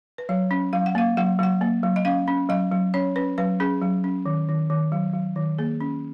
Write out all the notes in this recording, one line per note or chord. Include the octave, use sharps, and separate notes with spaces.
B4
F#3 C#5
C#4
F#3 F5
F#5
A#3 F5
F#3 F#5
F#3 F#5
A#3
F#3
D#5
C#4 F5
C#4
F#3 D#5
F#3
C#4 C#5
C#4 B4
F#3 B4
C#4 G#4
F#3
C#4
D#3
D#3
D#3
F#3
F#3
D#3
A#3 G#4
C#4